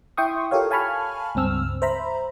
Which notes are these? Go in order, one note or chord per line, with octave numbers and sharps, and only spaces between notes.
E4 E5 G5 C6 C#6 D#6
F4 G4 A4 A#4 C#5 F5
F5 G#5 A5 B5 C#6 F6
C#2 G2 C4 E6 F6
C5 E5 A#5 B5